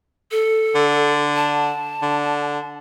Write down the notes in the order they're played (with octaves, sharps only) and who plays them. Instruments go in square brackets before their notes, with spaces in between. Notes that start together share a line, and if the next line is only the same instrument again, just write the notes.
[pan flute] A4
[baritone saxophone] D3
[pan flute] A5
[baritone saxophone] D3